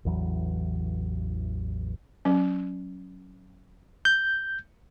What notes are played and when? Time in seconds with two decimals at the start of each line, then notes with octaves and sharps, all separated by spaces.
0.05 A1 E2 E3 F#3
2.25 F#3 C#4
4.05 G6